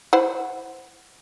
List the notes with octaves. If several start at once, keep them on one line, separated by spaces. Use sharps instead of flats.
E4 C5 F#5